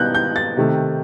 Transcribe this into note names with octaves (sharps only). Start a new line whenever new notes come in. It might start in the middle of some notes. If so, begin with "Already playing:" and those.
Already playing: B2 G3 B3 D#4 F#6 G6
G6
A6
C3 D#3 A3 D#4